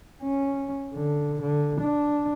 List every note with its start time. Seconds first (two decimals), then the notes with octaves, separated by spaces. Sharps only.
0.23 C#4
0.95 D3
1.42 D3
1.81 D4